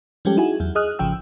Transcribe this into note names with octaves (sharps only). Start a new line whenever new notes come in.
F3 G3 G#3 C#4 G4 A4
D#4 E4 F#4 G#4 G#5
E2 F#3
G#4 D#5 D#6 F6 F#6
A1 C#3 F3 G5 E6